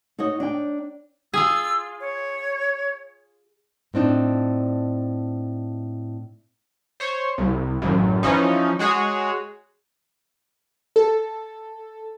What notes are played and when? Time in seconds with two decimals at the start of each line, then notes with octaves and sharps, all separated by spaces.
0.19 D#4 F#4 C#5 D#5
0.40 D4 D#4 G5
1.34 F4 G#4 E6
2.01 C#5
3.94 A2 C4 D4 D#4
7.00 C5 C#5
7.38 C2
7.82 A1 F#2
8.23 E3 F3 C#4 D#4
8.79 G#3 F#4 G#4 C#5
10.96 A4